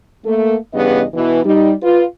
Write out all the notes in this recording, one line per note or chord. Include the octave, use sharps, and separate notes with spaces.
A3 A#3
E2 G2 C#3 B3 D#5
B2 E3
G3 D#4
F4 B4